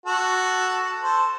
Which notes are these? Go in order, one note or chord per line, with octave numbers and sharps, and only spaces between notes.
F#4 A4
A4 C5